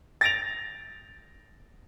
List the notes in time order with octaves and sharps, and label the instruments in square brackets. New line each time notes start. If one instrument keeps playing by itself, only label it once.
[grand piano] A6 A#6 D7 F7